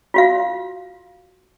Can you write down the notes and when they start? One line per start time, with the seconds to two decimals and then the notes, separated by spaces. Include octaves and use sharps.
0.14 F4 F#4 F5